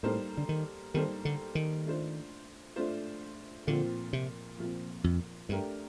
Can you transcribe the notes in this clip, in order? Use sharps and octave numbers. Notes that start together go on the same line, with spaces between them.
A2 G3 A#3 D#4 A4 C5
D3
D#3
D#3 G3 A#3 D#4 A4 C5
D3
D#3
A3 D4 F4 C5
A3 D4 F4 C5
A#2 D3 F3 C4 F4
C3
A#2 F3 C4 F4
F2
G2 A3 D4 G4 A#4